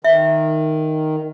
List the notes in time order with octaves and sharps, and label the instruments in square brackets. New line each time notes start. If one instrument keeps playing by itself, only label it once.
[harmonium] D#3 [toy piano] E5